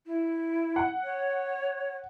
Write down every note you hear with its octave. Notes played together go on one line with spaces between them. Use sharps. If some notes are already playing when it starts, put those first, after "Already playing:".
E4
F#5
C#5